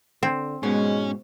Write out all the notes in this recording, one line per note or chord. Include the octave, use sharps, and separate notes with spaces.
D3 C4
G#2 B2 G#3 C#4